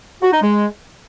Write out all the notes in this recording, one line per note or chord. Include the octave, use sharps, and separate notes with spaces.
F#4
D#4
G#3